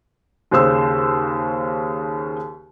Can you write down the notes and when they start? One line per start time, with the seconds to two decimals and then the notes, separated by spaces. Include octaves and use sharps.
0.51 D#2 C#3 C5 E6